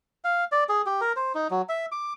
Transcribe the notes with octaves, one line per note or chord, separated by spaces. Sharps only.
F5
D5
G#4
G4
A#4
C5
D#4
F#3
E5
D6